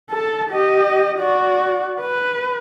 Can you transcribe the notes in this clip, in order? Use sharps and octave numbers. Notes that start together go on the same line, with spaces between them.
A4 A5
G4 D#5
F#4 D5
B4